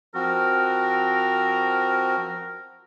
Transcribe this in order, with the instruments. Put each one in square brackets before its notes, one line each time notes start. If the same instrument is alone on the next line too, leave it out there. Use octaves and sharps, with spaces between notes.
[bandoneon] F3 C4 F#4 [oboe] A#4